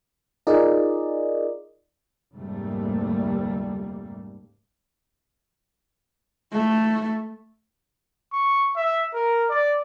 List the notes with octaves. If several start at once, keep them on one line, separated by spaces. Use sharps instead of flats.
D#4 F4 G#4 A#4 D5 D#5
F1 D2 G#2 G3 A3 A#3
A3
C#6
E5
A#4
D5